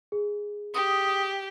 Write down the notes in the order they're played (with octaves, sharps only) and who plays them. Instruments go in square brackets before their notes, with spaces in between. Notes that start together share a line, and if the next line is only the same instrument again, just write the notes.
[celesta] G#4
[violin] G4 [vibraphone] D#6